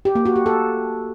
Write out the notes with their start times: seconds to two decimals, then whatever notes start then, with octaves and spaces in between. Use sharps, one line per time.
0.05 G4
0.15 A#3
0.26 F#4
0.36 G4
0.46 A4